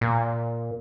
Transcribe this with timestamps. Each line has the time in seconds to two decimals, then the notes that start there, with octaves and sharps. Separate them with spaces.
0.01 A#2